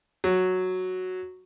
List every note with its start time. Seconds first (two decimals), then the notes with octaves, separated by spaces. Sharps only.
0.24 F#3